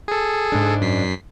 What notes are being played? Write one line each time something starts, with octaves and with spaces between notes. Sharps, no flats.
G#4 A4
G#2 C#3 D4
F#2 B6 C7